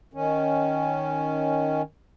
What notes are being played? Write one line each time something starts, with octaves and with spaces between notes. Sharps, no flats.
D#3 C#4